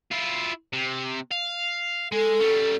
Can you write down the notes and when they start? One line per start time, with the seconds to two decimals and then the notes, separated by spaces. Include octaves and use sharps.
0.11 E4 F4
0.73 C3
1.31 F5
2.12 G#3 A4
2.40 G3 C#4